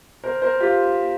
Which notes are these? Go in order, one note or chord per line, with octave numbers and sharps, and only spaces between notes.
A#4 C5
A#4 C5
F4 G4